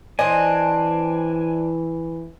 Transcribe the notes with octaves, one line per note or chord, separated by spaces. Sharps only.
E3 C4 D4 D#5 G#5